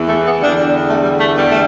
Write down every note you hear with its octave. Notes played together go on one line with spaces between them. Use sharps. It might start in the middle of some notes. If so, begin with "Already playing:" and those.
Already playing: E2 E3
A3
B3
E2 D3 G3 D4
A3
G3
A3
E2 D3 G3 B3
A3